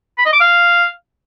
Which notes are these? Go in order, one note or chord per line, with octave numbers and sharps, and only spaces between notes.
B5
D#5
D6
F5